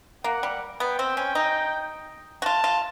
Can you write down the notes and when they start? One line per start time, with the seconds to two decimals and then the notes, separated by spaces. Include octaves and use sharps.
0.24 A#3 F#5
0.43 G3
0.79 B3 G5
0.99 C4
1.17 C#4
1.35 D#4
2.42 F#4
2.45 F4 A5
2.64 F4